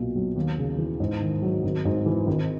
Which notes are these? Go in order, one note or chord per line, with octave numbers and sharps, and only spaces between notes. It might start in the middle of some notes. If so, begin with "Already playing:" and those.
Already playing: B1 A#2
F#3
D#2
C#3
E3
G#2
D#3
F#3
G#1
G#2
E3
G#1